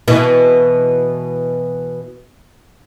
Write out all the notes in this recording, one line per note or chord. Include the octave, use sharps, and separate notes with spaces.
B2 E3